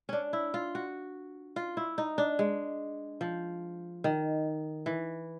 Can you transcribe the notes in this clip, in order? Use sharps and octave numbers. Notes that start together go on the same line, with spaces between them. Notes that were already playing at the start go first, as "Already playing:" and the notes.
C#4 D4
E4
F4
F#4
F4
E4
D#4
D4
G#3
F3
D#3
E3